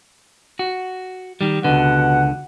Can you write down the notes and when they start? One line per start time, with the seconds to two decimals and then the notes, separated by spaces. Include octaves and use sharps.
0.59 F#4
1.41 D#3 G3
1.64 C#2 B2 D3 F#5